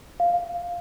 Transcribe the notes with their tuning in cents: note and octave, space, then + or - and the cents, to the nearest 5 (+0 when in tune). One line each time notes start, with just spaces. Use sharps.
F5 +0